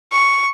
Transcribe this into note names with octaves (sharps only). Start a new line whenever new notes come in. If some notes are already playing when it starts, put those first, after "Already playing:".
C#6